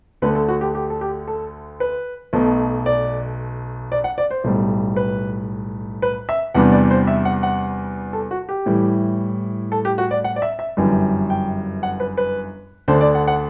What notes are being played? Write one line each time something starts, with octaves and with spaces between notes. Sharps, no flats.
D2 D3 A3 B4
A4
F#4
G4
G4
A4
G4
A4
B4
B1 B2 A3
D5
D5
F#5
D5
C5
B1 A2 G3
B4
B4
E5
E2 C3 G3 B3 D4 F#5
D5
C5
E5
F#5
F#5
A4
F#4
G4
A2 E3 G3
A4
G4
F#4
D5
F#5
D5
E5
E5
G1 F#2 E3 G3
G5
F#5
B4
B4
D2 D3 A3 D4 C5
D5
F#5
F#5